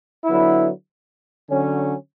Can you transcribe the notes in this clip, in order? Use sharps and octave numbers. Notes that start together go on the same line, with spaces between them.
D3 F#3 B3 E4
D3 F#3 C#4